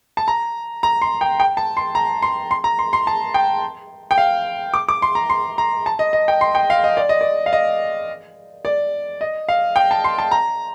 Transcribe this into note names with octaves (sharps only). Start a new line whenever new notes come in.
A5
A#5
A#5
C6
G5
G5
A5
C6
A#5
C6
C6
A#5
C6
C6
A5
G5
G5
F5
D6
D6
C6
A#5
C6
A#5
A5
D#5
D#5
G5
C6
G5
F5
D#5
D5
D#5
D5
F5
D#5
D5
D#5
F5
G5
A5
C6
A5
A#5